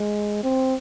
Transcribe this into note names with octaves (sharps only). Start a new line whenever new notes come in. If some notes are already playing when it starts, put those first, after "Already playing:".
Already playing: G#3
C4